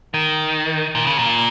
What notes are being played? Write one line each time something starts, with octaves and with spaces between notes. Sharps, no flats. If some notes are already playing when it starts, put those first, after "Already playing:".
D#3
A#2
C#3
A#2